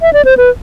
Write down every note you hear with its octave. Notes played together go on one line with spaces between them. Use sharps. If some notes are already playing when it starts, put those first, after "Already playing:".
E5
D5
C5
B4